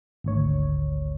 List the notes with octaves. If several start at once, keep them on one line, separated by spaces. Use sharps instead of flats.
G#1 D2 C#5